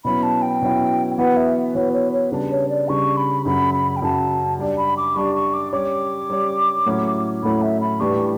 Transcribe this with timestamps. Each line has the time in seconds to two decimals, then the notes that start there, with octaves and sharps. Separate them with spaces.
0.05 B2 F#3 C#4 E4 B5
0.23 A5
0.42 G5
0.62 B2 F#3 C#4 E4
1.18 E3 B3 F#4 B4 F#5
1.37 E5
1.75 E3 B3 F#4 B4 C#5
1.93 C#5
2.13 C#5
2.32 C#3 G3 D4
2.51 C#5
2.70 D5
2.89 C#3 G3 D4 C#6
3.17 B5
3.45 F#2 C#3 F#3 B5
3.74 B5
3.97 G5
4.02 F#2 C#3 F#3 A5
4.59 G3 D4 G4 D5
4.78 B5
4.97 D6
5.16 G3 D4 G4 D5 C#6
5.35 C#6
5.53 D6
5.73 G3 C#4 G4 C#5 D6
6.30 G3 C#4 G4 C#5
6.86 A2 F#3 A3 C#4 E4
7.43 A2 F#3 A3 C#4 E4 B5
7.62 E5
7.81 B5
8.00 A2 E3 G3 D4 G4 C#6